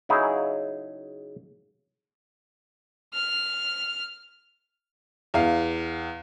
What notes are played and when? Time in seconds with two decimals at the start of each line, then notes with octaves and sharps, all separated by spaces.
0.09 C#3 F#3 D#4 E4 G#4
3.14 F6
5.34 E2 F5